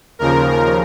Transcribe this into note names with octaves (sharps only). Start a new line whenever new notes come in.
D#2 C#3 F3 A#4
A#4